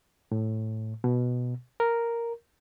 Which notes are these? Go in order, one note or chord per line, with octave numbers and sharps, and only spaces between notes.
A2
B2
A#4